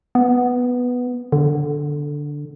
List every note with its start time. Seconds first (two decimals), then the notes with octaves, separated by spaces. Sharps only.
0.15 B3
1.32 D3